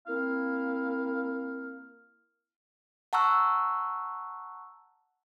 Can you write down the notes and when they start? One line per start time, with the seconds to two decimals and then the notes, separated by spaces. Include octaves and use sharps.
0.07 A#3 C4 E4 F5
3.13 F#5 A5 A#5 C#6 E6 F#6